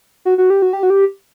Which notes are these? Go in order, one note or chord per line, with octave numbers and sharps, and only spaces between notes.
F#4
F#4
G4
F#4
G4
F#4
G4